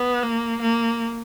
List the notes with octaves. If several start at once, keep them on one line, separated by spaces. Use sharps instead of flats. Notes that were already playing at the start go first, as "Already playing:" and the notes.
Already playing: B3
A#3
A#3